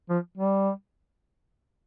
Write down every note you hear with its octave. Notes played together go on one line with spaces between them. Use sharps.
F3
G3